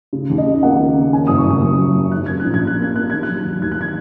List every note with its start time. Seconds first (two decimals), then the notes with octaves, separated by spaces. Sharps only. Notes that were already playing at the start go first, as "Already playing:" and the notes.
0.13 C#3
0.30 D#2
0.38 D#5
0.47 C#3
0.63 A#3 F#5
0.80 A#3
0.96 C#3
1.13 C#4 G#5
1.27 F#1 D#6
1.38 C#6
1.46 F#1 D#6
1.63 F#2
1.79 F#3
1.96 C#4
2.12 G#2 F#6
2.26 A#3 G#6
2.40 F#6
2.45 A#1
2.54 G#6
2.62 A#1
2.67 F#6
2.79 A#3 G#6
2.95 A#3 F#6
3.10 D#3 G#6
3.23 F#6
3.29 F#3
3.45 D#2
3.61 D#2 G#6
3.72 F#6
3.81 G#6